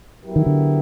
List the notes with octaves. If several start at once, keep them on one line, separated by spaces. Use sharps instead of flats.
F#3 B3 E4 G4 A#4
D#3
D3